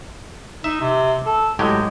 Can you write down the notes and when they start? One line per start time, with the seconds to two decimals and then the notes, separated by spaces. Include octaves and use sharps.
0.64 D#4 E5
0.81 C3
1.26 A4
1.59 A2 F#3 G#3 G4